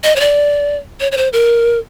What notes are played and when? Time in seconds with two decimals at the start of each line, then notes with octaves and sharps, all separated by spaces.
0.04 D#5
0.16 C#5
0.20 D5
1.00 C#5
1.12 C#5
1.17 C5
1.33 A#4